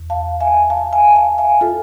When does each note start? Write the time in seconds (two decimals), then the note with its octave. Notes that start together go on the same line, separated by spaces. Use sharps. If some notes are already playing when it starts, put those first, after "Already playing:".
Already playing: E2
0.10 F5 A5
0.41 E5 G#5
0.70 F5 A5
0.93 E5 G#5
1.16 F5 A5
1.38 E5 G#5
1.61 F4 A4